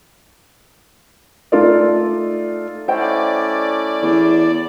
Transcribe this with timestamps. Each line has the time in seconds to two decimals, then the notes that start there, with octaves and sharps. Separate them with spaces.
1.52 A3 D#4 F4 A4 D5
2.88 A3 C#4 E4 C5 D5 D#5 G5
4.02 E2